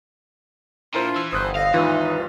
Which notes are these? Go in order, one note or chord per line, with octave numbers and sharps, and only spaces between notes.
A#2 D4 E4 F4 A#4 C5
E3 E6
G1 C5 D#6 F#6
D3 D#5 F5
G#1 D#2 E3 D#4 F4 B4